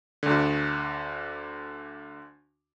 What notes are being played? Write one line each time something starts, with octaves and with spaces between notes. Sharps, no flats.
D2 D3